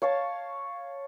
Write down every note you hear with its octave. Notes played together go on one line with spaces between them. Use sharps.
C#5 F5 A5